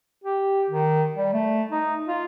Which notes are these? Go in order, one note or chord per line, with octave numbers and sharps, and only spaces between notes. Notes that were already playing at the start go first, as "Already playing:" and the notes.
G4
D#3
G3
A3
D#4
F4